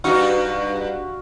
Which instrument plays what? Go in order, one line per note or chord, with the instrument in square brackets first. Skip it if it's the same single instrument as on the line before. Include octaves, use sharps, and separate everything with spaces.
[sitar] G2 D#4 [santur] F#4 F5